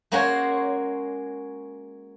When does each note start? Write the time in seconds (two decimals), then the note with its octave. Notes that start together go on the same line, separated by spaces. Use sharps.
0.12 G#3 A#3 C#4 F#4 C5 C#5